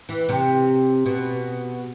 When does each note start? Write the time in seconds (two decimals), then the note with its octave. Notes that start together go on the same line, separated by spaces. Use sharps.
0.09 E3
0.29 C3
1.06 B2